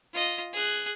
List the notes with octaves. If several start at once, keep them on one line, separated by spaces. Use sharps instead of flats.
F4 D#5
G#4 F#6